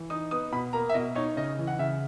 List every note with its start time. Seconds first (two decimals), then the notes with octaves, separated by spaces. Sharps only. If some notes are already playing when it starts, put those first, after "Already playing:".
Already playing: E3
0.10 D#4 D#6
0.31 B3 D#6
0.52 B2 B5
0.73 A#3 A#5
0.89 E5
0.94 B2 D#5
1.15 D#4 C#5
1.37 C#3 D#5
1.59 E3
1.67 F#5
1.79 C#3 E5